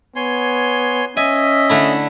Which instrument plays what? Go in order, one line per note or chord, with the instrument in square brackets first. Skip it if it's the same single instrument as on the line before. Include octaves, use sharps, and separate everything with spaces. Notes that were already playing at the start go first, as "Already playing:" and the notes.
[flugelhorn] B3 [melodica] C#5 G#5 C6
[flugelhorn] C#4 [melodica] D#5 E5 [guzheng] G#5
[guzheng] D3 A3 E4